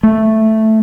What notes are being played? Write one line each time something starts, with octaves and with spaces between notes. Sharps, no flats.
A3